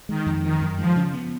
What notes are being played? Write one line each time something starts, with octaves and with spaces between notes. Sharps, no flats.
D#3 G#3
F2
D#3 F3
F#2
F3 G#3
C#3
B3